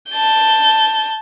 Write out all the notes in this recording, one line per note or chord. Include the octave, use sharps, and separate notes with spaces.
A5 G6